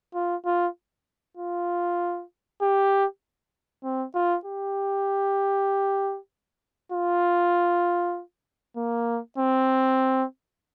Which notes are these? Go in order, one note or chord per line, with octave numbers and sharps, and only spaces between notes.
F4
F4
F4
G4
C4
F4
G4
F4
A#3
C4